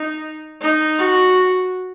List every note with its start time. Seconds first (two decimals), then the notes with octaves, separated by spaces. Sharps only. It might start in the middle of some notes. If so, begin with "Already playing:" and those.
Already playing: D#4
0.61 D#4
0.99 F#4